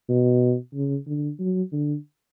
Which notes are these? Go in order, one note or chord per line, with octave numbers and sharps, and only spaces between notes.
B2
C#3
D3
F#3
D3